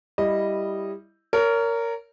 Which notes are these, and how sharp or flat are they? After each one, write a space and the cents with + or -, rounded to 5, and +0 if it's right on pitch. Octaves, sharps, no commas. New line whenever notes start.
G3 +0 E4 +0 D#5 -10
A#4 -10 C#5 +30